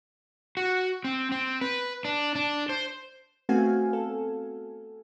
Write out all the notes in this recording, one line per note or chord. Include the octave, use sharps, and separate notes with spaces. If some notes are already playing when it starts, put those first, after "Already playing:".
F#4
C4
C4
B4
D4
D4
C5
A3 B3 C4 F#4 F5 G#5
A4